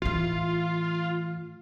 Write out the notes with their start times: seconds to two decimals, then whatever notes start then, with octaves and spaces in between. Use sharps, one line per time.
0.02 A2 E3 F4